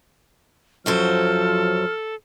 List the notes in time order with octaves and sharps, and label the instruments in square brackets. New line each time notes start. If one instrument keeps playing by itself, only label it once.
[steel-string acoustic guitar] F#2 F#3 C5 [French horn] F3 [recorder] A4 [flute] F6